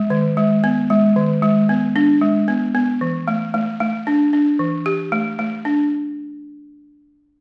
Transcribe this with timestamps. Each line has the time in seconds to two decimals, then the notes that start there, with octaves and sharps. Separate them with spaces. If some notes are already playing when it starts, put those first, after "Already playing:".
Already playing: G#3
0.10 D#3
0.37 G#3
0.64 B3
0.90 G#3
1.16 D#3
1.43 G#3
1.69 B3
1.96 D4
2.21 G#3
2.48 B3
2.75 B3
3.01 E3
3.28 A3
3.54 A3
3.80 A3
4.07 D4
4.33 D4
4.59 E3
4.86 G4
5.12 A3
5.39 A3
5.65 D4